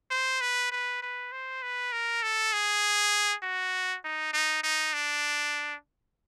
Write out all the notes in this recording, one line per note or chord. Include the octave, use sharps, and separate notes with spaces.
C5
B4
B4
B4
C5
B4
A#4
A4
G#4
F#4
D#4
D#4
D#4
D4